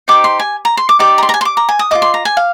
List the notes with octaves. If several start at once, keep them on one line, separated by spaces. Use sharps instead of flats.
D#4 G4 C5 D6
C6
G#5
A#5
C6
D6
D#4 G4 D5 D6
A#5
C6
A#5
G#5
C6
D6
A#5
G#5
D#6
F4 G#4 D#5 D6
C6
A#5
G#5
F5